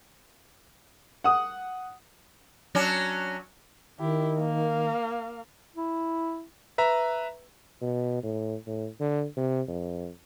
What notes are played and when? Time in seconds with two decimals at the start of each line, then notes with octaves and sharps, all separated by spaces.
1.24 F#5 D#6
2.75 F#3 C#4 D4
4.00 D#3 E4 G4
4.38 A#3 F5
5.76 E4
6.78 B4 E5 A#5
7.81 B2
8.23 A2
8.67 A2
9.00 D3
9.37 C3
9.68 F2